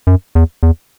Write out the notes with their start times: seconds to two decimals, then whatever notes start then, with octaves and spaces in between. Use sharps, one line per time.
0.07 F#2
0.35 E2
0.63 E2